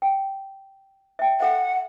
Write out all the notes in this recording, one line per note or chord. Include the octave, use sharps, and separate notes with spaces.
G5
E5 G5
A4 E5 F#5